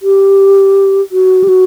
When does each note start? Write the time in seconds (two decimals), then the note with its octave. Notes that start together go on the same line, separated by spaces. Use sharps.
0.02 G4
1.12 F#4
1.44 G4
1.48 F#4